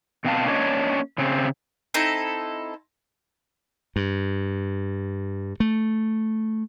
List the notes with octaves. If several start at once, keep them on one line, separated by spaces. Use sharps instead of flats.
B2 C4 F5 A5
A#3 C#4 D4 C#5 D#5
C#3 C4 G#4
C4 D#4 E4 A4
G2
A3